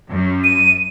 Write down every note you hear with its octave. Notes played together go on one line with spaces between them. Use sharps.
F#2
D#7